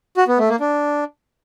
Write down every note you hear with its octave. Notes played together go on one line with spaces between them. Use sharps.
F#4
B3
A3
A#3
D4